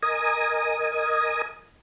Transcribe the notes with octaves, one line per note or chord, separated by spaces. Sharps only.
A#4 D#5 G#5 D#6